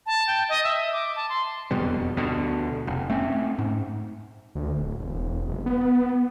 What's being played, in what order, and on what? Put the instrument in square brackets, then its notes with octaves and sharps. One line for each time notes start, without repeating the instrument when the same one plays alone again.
[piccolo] A5
G5
D#5
E5
D6
A5
C6
[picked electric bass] E1 F2 B2 G3
D2 B2 D3
F1
A3 C4 C#4
G#2
[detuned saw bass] D2
D1
E1
F#1
B3